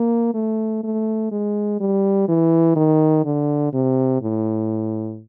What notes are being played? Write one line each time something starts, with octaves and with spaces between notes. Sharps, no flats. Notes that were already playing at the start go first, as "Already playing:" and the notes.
Already playing: A#3
A3
A3
G#3
G3
E3
D#3
D3
C3
A2